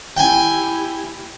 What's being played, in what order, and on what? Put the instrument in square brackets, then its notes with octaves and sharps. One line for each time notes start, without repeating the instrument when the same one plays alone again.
[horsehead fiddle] E4 G4 [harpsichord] G5 G#5